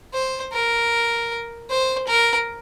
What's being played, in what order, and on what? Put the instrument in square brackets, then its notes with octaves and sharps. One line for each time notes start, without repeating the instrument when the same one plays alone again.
[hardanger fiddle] C5
A#4
C5
A#4